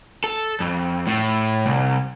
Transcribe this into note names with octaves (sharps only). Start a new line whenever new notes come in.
A4
F2
A2
C2